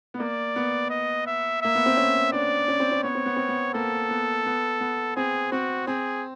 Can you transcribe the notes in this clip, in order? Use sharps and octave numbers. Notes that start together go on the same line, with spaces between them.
B3
A#3 D5
B3
D#5
E5
A#3 E5
B3
C4
C#4
D4 D5
C#4
C4
C#4
B3 C#5
C4
B3
C4
B3
A#3 A4
B3
B3
B3
C4 G#4
C4 F#4
C4 G#4